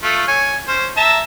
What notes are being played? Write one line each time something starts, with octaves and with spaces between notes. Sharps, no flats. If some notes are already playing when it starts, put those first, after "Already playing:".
A3 F4
C#5 G#5
C#4 C5
E5 A5 A#5